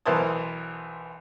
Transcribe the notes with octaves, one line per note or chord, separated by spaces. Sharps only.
B1 E3 A#4 C5 A5 D#6